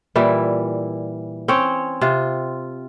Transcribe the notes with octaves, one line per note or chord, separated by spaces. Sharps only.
A#2 E3 G3 E4
C4 C#4 C#5 G5
C3 F4